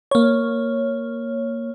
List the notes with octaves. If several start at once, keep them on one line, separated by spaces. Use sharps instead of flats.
A#3 C#5